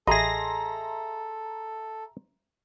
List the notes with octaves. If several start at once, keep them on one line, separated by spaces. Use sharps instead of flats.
A1 G#4 A4 D#5 E5 A#5 C6 A#6